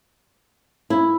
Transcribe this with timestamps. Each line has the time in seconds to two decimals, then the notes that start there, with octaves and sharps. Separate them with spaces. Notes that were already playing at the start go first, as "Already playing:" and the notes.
0.90 E4